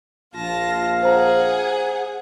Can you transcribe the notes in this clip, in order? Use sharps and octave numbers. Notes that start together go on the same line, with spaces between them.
A#1 F4 F5 A5 A#6
G#4 C5 F#5 A#5